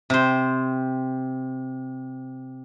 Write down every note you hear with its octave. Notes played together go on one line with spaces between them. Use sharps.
C3 C5